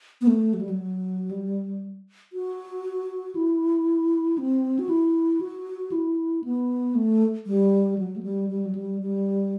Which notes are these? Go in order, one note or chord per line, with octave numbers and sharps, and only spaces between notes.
B3
A3
F#3
G3
F#3
G3
F#4
E4
C4
F#4
E4
F#4
E4
B3
A3
G3
F#3
A3
G3
G3
F#3
G3
G3